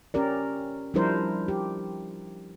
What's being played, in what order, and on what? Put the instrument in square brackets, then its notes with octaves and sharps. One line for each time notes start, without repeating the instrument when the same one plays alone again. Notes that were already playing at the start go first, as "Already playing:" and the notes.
[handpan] C#4 G4 A#4 D5
F3 G3 D4 E4 A#4 C5
G4